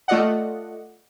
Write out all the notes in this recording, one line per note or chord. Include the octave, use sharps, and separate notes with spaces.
A3 F4 D5 D#5 F#5